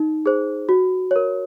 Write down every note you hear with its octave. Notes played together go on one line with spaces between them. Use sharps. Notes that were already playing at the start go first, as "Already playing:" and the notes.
Already playing: D#4
G#4 C5
F#4
A#4 C#5